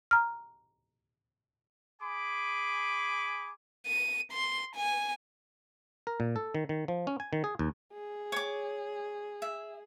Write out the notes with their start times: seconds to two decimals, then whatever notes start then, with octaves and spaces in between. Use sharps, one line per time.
0.11 A#5 F6
2.02 G#4 G#5 B5 D6
3.86 D#7
4.32 C6
4.75 G#5
6.07 A#4
6.20 A#2
6.36 A4
6.55 D#3
6.69 D#3
6.88 F3
7.07 C#4
7.20 G#5
7.33 D#3
7.44 G#4
7.59 D#2
7.93 G#4
8.32 C#5 D6
9.42 E5